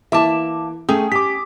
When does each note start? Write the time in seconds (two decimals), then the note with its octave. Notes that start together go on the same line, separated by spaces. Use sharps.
0.12 E3 A#3 E5 A5 D6
0.89 A3 C#4 G#4 G5 D#6
1.12 G4 D6 B6